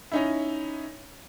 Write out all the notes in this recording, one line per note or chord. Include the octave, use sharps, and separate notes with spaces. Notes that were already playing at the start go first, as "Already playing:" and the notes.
C#4 D#4 E4